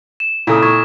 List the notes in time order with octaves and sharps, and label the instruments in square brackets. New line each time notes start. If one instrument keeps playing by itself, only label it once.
[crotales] E7
[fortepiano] A#2 C#3 [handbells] E4 A4 D#6
[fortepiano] A#2 [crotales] C#6 [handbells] G#6